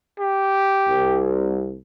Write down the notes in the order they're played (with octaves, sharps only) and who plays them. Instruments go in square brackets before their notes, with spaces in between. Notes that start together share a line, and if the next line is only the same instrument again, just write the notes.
[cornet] G4
[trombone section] C2